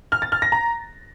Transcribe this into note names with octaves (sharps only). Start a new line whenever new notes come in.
F6
A6
F6
A#6
A#5